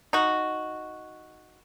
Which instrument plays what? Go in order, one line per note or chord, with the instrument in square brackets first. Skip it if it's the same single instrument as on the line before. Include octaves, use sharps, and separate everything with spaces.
[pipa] D#4 F#4